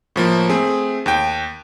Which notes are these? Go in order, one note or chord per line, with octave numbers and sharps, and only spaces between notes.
A2 F3 A#3
A3 C4 G#4
D#2 G5